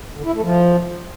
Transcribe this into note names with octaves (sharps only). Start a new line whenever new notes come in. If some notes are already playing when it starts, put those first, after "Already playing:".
D3
E4
A3
F3